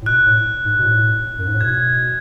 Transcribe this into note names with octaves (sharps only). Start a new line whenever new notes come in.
A2
B2 F#6
A2
G#2
B2
A2
F#2
G#2
A2
B2 G#6